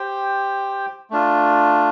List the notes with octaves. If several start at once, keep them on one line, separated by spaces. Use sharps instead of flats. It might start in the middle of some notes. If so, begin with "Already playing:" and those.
Already playing: G4 C5 G5
A3 D4 F4